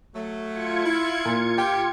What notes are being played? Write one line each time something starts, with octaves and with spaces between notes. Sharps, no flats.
F#3 A3
F4 G#6 C#7
E4
A#2
G4 G5